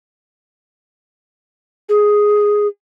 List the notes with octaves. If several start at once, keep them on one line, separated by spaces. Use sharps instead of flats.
G#4